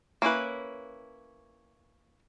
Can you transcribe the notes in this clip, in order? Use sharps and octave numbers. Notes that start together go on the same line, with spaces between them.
A#3 C#4 E4 B4